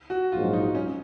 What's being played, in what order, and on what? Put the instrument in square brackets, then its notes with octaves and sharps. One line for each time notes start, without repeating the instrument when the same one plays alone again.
[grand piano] F#4
[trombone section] A#1 G#2 F#3 [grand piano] F4
[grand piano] D#4
C#4